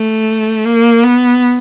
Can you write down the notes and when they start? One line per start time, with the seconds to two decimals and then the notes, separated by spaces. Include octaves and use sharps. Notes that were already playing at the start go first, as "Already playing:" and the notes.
Already playing: A3
0.65 A#3
1.03 B3